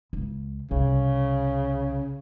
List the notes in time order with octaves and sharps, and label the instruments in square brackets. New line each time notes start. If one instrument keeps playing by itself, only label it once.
[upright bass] C#2
[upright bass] C2 [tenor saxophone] C#3